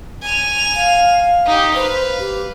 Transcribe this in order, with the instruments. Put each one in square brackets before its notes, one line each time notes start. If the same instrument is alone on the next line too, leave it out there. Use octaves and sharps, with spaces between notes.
[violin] G#5 F7
[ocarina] F5
[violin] D#4 G4
[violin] B4 F5 [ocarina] C5
[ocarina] G4